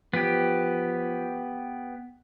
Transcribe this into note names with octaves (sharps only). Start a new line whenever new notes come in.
F3 B3 G4